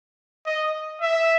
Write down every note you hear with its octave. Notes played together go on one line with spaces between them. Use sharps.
D#5
E5